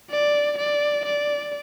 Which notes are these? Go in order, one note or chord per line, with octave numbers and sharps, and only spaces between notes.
D5
D5
D5